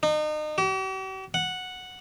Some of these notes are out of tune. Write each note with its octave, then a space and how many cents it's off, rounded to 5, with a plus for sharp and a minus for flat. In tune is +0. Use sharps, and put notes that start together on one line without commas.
D#4 -35
G4 -45
F#5 -5